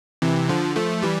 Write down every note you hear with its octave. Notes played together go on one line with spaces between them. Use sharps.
C3 E3
D3 F3
F3 A3
E3 G3